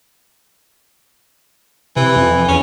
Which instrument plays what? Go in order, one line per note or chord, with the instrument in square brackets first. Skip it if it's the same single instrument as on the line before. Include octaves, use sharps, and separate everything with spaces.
[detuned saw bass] C3 [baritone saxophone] E3
[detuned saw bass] F2
[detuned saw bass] E2 [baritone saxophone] C#4